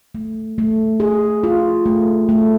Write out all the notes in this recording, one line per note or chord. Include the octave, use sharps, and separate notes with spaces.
A3
A3
G#4
F4
A3
A3